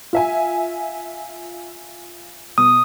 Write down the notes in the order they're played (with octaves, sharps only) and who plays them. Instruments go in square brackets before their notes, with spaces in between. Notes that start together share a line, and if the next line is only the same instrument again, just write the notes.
[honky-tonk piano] F4 E5 G#5
[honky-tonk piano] B2 [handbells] D#6